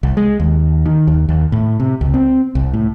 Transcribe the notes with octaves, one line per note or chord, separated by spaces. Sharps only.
C2
G#3
D#2
D#3
D#2
D#2
A2
C3
C#2
C4
C2
A2